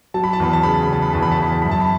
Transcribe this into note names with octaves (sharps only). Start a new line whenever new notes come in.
F#3 A5
B5
A5
E2 B5
A5
C#3 B5
A5
B5
C#3 A5
B5
E2 A5
B5
A5
E2 B5
A5
F#2 B5
A5
B5